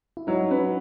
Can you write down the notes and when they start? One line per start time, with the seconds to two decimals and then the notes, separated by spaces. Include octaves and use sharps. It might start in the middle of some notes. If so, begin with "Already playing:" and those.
0.17 E4
0.27 F#3 D#4
0.51 C#4 B4